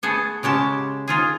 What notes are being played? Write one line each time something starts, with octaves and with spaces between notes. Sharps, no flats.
A3 B3 G#4 A4
C#3 G#3 G4 A5
D#4 F4 G#4